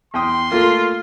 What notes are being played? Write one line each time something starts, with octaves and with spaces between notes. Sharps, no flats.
E2 G5 C6 D#6
A3 A#3 F4